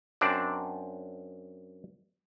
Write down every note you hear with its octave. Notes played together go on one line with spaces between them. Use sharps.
F#2 C4 D4 D5